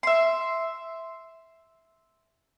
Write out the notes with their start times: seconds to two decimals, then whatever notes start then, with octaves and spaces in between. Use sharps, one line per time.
0.03 E5 C6